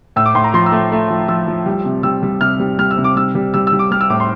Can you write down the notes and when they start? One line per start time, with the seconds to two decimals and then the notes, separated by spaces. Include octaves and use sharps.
0.16 A2 E6
0.26 D6
0.35 A2 C6
0.44 A#5
0.54 F3 C6
0.66 E6
0.72 A3
0.92 A3
1.10 F3
1.28 F3 E6
1.47 F3
1.66 G3
1.85 C3
2.03 G3 E6
2.23 G3
2.41 C3 F6
2.60 G3
2.79 G3 F6
2.91 E6
2.98 C3
3.04 D6
3.16 G3 E6
3.35 G3
3.54 G3 E6
3.67 E6
3.72 G3
3.79 D6
3.91 G3 F6
4.01 E6
4.10 A2 D6
4.20 C6